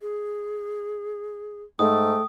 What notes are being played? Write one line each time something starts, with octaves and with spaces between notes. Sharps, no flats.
G#4
G#2 A3 G5 D#6